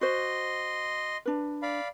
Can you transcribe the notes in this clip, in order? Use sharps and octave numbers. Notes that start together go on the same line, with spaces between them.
F#4 C5 D#5 C6
D4 B4
D5 F5 B5